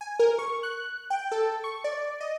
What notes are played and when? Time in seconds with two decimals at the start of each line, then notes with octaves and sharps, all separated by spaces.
0.01 G#5
0.19 A#4
0.39 C#6
0.63 F#6
1.10 G5
1.32 A4
1.64 C#6
1.84 D5
2.21 D#5